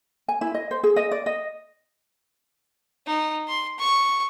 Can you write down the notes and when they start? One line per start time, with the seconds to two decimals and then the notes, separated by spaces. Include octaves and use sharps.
0.28 G#5
0.41 E4
0.54 D#5
0.71 C5
0.83 G#4
0.96 D#5
1.11 D5
1.26 D#5
3.07 D#4
3.48 C6
3.79 C#6